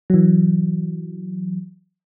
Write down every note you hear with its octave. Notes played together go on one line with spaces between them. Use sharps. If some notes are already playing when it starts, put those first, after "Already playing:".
E3 F#3